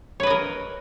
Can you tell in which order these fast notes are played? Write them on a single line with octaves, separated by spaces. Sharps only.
C#5 B4 D#5 A#4